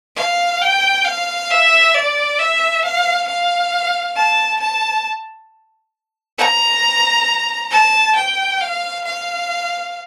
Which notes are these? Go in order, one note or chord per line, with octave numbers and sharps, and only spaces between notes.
F5
G5
F5
E5
D5
E5
F5
F5
A5
A5
A#5
A5
G5
F5
F5